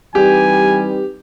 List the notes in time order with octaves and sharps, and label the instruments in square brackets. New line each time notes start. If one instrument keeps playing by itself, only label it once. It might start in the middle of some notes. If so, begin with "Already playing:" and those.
[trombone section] E3 G3 [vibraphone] C4 D#4 B4 [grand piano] G4 [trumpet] G#5